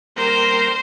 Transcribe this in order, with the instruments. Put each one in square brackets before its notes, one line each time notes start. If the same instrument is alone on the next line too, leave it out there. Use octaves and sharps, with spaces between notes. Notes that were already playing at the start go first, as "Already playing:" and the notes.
[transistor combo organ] G3 A#3 A#4 [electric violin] C5